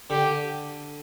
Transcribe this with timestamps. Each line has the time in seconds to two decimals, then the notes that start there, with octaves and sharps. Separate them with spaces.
0.10 D3 G4